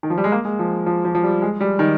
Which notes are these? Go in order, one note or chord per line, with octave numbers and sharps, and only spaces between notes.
D#3
F3
G3
G#3
A#3
G#3
F3
F3
F3
F3
G3
G#3
G3
D#3